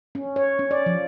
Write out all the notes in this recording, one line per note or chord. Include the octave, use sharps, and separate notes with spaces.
C#4
C#5
C#4
D5
F3